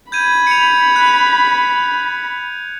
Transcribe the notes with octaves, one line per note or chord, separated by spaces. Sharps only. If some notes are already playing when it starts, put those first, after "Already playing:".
B5 G6 G#6 D#7
C#7 F7
F#6